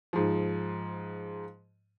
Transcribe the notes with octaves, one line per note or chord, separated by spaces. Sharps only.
G#2 F3